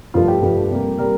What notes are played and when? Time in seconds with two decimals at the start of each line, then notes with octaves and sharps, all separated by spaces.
0.14 G2 F3 A3 F4
0.28 G4
0.43 G2 F3 A3
0.70 C3 G3 A#3
0.98 C3 G3 A#3 A#4